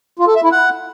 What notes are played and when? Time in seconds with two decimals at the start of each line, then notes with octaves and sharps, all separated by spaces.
0.19 F4
0.27 A4
0.36 E5
0.44 E4
0.52 F#5